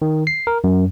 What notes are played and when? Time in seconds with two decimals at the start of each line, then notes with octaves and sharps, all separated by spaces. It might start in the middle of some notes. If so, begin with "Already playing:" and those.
0.02 D#3
0.27 C7
0.47 A#4
0.64 F#2